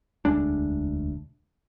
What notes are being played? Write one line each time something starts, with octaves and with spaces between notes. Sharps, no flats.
E1 D2 G#3 D4